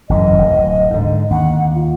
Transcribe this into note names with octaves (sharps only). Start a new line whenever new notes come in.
G1 F#2 E3 D#5
D1
G#2 D3
D#2 F#5
F4